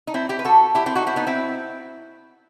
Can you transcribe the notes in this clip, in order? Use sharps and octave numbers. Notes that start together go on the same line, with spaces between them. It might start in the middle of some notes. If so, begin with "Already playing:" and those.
D#4
C4 E4
E4 G4
B4
F#4 A4
E4 G4
C4 E4
D#4 F#4
C4 E4
B3 D#4
C4 E4